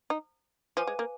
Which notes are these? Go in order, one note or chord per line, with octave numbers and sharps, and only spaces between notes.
D#4
F3 B4 F5 G#5 D6
G#3
A#3